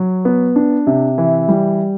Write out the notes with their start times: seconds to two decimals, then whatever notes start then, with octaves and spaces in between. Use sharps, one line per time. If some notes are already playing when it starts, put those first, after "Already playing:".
Already playing: F#3
0.25 B3
0.56 D4
0.87 C3
1.18 E3
1.49 G3